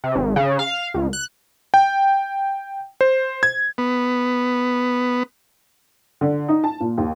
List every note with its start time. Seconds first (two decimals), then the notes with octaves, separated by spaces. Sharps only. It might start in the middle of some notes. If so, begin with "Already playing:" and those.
0.04 C3
0.16 G#1
0.36 C#3
0.59 F5
0.94 C#2
1.13 F#6
1.74 G5
3.01 C5
3.43 G#6
3.78 B3
6.21 D3
6.48 D#4
6.64 A5
6.81 A#2
6.98 D#2